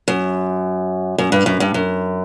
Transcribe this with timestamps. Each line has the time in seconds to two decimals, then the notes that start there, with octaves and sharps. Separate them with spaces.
0.08 F#2
1.18 F#2
1.32 G2
1.46 F#2
1.60 G2
1.74 F#2